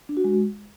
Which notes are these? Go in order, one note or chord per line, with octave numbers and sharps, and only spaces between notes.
D4
F#4
G#3